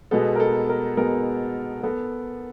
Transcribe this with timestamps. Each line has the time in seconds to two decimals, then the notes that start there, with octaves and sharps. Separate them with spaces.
0.11 B2 G#3 B3 A4
0.36 A#4
0.40 A4
0.69 A#4
0.97 B2 G#3 B3 A#4
1.83 B3 A4